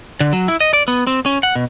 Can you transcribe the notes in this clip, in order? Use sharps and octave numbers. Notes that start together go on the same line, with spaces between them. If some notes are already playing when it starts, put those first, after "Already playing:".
D3
F#3
E4
D#5
D5
B3
C4
C#4
F#5
B2